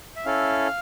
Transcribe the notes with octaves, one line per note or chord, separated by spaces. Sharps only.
E5
C#4 E4 A4 F5